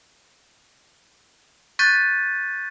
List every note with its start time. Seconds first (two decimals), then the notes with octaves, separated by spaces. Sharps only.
1.79 C#6 F#6 G6 A6 B6 D#7